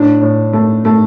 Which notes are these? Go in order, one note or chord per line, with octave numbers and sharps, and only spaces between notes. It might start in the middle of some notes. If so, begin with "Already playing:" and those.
Already playing: A2 D4
A2
A3
A3